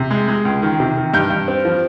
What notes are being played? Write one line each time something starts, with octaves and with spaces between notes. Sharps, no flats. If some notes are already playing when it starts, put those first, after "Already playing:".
Already playing: C3
G#3
G#3
C#2
D#3
C3
D#3
G2 G6
G2
C4
F3